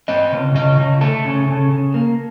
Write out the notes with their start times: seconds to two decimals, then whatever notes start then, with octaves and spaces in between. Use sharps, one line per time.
0.08 C4 D#5
0.32 C#3
0.54 C#3 D#5
0.78 C#3
1.01 A3 A4
1.25 C#3
1.48 C#3
1.71 C#3
1.94 A#3